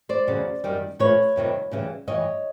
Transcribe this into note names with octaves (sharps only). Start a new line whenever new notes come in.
C5 D5
E2 C#3 F#3 A3
F#2 D#3 G3
A#2 F3 A3 B4 C#5
F2 C3 D#3 G3
D2 C#3 E3 G3
G2 E3 G3 C#5 D#5